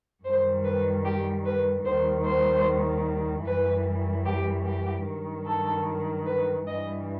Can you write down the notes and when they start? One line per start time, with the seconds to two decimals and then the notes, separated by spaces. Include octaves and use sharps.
0.24 F#2 D#3 G3 C5
0.64 B4
1.05 G4
1.45 B4
1.85 D#2 D#3 G3 C5
2.25 C5
3.45 F#2 E3 G3 B4
4.25 G4
4.65 G4
5.06 G2 D#3 F#3
5.46 A4
6.26 B4
6.66 G2 E3 G3 D#5